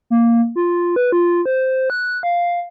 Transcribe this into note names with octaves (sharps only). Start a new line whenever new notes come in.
A#3
F4
B4
F4
C5
F#6
F5